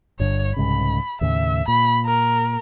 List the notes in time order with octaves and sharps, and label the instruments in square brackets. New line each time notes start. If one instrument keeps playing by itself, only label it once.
[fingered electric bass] G1 G2 D3 [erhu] C#5
[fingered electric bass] C2 G#2 C#3 [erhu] B5
[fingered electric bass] D#2 A2 C#3 [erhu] E5
[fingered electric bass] A#2 [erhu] B5
[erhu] A#4